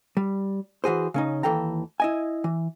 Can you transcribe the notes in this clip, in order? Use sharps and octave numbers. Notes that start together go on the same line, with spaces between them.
G3
E3 F#4 G#4 C5
C#3 C#4 D#4
D#2 E3 A4 G5 A#5
E4 D#5 G#5
E3